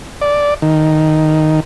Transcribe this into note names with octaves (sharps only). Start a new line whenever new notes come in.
D5
D#3